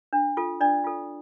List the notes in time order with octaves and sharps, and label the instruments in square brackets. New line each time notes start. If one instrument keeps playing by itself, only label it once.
[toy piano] D4
F4 A4
D4 D5
F4 A4